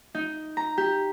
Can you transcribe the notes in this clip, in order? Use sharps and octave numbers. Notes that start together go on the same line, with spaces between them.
D#4
A#5
G4